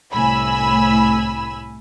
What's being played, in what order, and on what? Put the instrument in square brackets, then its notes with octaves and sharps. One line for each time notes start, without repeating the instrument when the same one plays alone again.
[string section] C2 A2 G#5 B5 E6